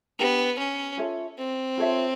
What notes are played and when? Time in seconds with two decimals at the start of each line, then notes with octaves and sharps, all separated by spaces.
0.19 B3 D4 G4 B4
0.59 C#4
0.97 F4 A4 C#5 E5
1.38 C4
1.78 F4 A4 C#5 E5